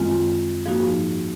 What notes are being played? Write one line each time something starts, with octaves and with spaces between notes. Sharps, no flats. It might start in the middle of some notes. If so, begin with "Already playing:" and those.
Already playing: F#2 D#3 G#3 C4 F4
G#2 F3 A#3 D#4 F#4